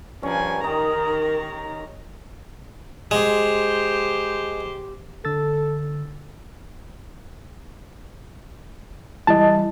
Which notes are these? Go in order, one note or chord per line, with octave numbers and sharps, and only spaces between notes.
G2 F3 C#4 A#4 G#5
D#3 D#4 G4 A#4 D#5 A#5
G#3 G4 C5
D3 A4 E6 A6
E3 G3 D#5 A5